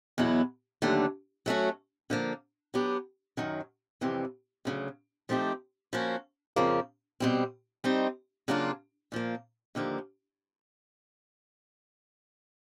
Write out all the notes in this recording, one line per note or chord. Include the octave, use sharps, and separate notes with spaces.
E2 B2 F#3 B3 E4
D#2 D3 F#3 A3 D4
F#3 A3 C#4 F#4
D3 F3 A#3
F#3 B3 D4 G4
F#2 D#3 F#3
F2 C3 E3 G3
D2 C#3 F#3
F3 A3 C4 D#4 G4
F3 A#3 C#4 F#4
F2 C#3 F3 A#3
B2 G3 C4
G3 C4 D#4
C#3 F#3 A#3 D4 F4
A#2 F3 A#3
D#2 D3 F3 A#3